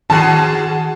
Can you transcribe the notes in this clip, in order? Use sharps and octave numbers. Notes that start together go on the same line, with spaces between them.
D#3 F#4 G#4 A5